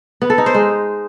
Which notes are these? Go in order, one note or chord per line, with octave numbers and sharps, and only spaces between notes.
B3
A4
D#4
C5
G#3